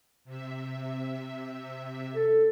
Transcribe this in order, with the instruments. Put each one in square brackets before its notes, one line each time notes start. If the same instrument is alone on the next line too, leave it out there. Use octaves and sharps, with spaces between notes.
[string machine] C3 E5
[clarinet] A4